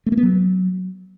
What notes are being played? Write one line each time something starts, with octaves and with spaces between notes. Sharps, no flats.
A3
A#3
B3
F#3